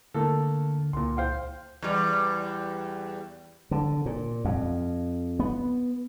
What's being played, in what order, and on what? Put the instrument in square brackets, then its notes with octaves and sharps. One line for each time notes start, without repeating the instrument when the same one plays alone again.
[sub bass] D3 [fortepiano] A3 A#3 A4
[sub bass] C#2 [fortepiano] A#2 C6
[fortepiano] C5 F5 G5
[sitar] E2 G3
[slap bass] D3
A#2
F2
B3